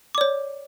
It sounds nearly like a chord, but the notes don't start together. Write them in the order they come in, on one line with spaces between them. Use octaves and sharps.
D6 D5 C#5